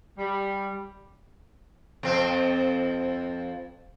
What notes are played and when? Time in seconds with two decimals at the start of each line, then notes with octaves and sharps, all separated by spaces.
0.18 G3
2.03 F2 C4